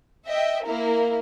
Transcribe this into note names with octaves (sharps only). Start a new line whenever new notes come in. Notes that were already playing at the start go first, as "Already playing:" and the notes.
D#5 E5 G5
A#3 E4 A#4